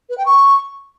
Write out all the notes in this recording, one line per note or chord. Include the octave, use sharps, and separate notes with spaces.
B4
G5
C#6